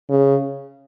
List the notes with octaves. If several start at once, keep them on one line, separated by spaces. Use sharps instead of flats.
C#3